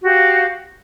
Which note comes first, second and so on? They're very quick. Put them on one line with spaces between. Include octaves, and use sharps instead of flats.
F#4 G4 F5